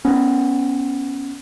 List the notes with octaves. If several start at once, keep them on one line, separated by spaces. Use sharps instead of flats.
B3 C#4